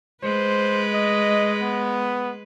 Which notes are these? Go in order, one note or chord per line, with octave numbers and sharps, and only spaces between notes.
G#3 B4 C5
D#5
B3